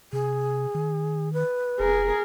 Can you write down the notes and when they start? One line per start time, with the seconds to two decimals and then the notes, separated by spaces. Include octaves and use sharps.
0.13 C3 G#4
0.75 D#3
1.33 B4
1.80 F1 G#4 A#4